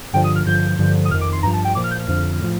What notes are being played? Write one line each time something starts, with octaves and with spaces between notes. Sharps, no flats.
G2 D3 F3 G5
D#6
F6
G2 D3 F3 G6
G2 D3 F3
D#6
F2 D#3 F6
D6
C6
G2 F3 A#5
A5
G5
A#2 F3 D6
F6
G6
F6
F2 D3 F3
A2 F3